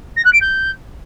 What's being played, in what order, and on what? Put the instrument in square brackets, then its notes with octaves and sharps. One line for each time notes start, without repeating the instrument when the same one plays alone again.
[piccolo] A#6
F#6
D7
G6